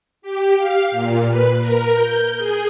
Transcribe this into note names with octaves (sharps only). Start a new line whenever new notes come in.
G4
F5
A#2
B4
A#4
G6
G#4